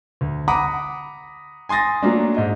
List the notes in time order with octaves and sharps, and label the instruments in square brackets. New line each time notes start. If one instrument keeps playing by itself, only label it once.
[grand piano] D2
F#5 A#5 B5 D6 D#6
G#5 C6 D#6 A6 A#6
F#3 A3 A#3 D4
G#2 D#5